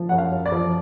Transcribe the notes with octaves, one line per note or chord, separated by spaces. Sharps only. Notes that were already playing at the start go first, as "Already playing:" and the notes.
Already playing: F3
F#2 F#5
F5
F#2
D5
F3